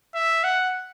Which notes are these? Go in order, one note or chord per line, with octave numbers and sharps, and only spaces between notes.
E5
F#5